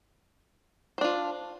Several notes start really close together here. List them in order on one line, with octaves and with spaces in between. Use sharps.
C5 D4 F4